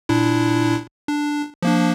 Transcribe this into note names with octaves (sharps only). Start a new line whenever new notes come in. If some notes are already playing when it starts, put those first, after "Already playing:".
A#2 D4 E4
D4
F3 A#3 D4